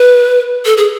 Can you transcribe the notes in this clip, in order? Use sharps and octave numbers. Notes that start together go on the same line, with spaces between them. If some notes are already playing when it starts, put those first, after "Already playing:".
Already playing: B4
A4
G#4